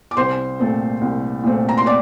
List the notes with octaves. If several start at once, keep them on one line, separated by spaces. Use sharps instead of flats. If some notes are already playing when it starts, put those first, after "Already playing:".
D6
C2 C5 C6
A#2 A3 C4
C2
A#2 A3 C4
A#5
C6
D5 D6